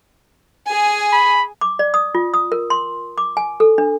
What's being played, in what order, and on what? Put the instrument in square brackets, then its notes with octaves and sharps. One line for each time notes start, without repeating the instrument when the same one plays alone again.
[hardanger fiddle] G#4 G#5
[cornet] B5
[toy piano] D6
D5
D#6
F4
D#6
A#4
C6
D6
G#5
A4
D4